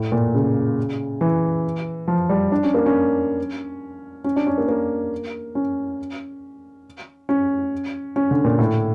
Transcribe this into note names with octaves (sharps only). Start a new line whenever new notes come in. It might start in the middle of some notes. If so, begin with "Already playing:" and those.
Already playing: A2
A#2
C#3
E3
F3
G3
D4
C#4
A#3
C#4
C#4
D4
C#4
A#3
A#3
C#4
C#4
C#4
D3
A#2
A2